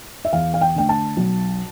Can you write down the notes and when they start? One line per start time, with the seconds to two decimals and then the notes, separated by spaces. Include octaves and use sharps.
0.25 E5
0.33 E2 F5
0.54 F5
0.61 G5
0.75 D3 A3 G5
0.89 A5
1.17 B1